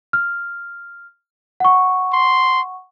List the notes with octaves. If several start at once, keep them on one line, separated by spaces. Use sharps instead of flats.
F6
F#5 C#6
C6